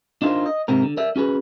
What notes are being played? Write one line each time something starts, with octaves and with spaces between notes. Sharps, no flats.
D4 D#4 F4 G4 A#4 C5
D#5
G#2 C3 C4 A#4
D3
A#4 D5 E5
C#4 F#4 G#4 B4